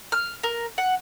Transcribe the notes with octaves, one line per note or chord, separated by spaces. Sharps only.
F6
A#4
F#5